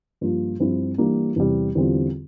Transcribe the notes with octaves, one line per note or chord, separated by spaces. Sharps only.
G2 F3 A#3 F4
G2 F3 C4 E4
E3 G3 A#3 D4
E2 C3 G3
E2 D3 G3 C4 F4